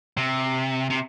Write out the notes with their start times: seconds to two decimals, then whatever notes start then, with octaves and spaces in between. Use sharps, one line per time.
0.17 C3
0.90 C3